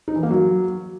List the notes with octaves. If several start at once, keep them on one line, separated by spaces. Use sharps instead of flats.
D#4
E3
A#3
F#3